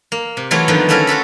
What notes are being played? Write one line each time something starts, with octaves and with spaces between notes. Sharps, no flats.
A#3
C3
E3 F#3 A3 E4 F4 C#5
D3 D#3 F3 F#3 B3 D#4
A3 A#3 C#4 E4 A4 A#4
F4 F#4 A4 B5